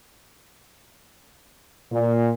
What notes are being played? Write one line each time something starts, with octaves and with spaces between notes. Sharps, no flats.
A#2